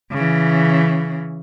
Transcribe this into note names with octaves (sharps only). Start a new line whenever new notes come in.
C#3 E3